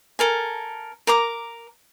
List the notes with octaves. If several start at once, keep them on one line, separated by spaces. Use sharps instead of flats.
A4 A#4 G#5
A#4 A#5 D6